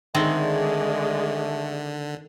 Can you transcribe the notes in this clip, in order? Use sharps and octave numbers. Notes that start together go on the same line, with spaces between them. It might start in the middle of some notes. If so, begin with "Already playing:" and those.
D3 D#3 G#3 A3 C4 D5